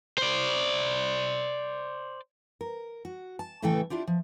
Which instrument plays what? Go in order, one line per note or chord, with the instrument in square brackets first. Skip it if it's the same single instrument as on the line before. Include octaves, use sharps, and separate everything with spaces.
[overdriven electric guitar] C5 D5
[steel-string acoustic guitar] A#4
F#4
A5
A2 C#3 E3 A3 A4 G5
D4 E4 F4 G4
F3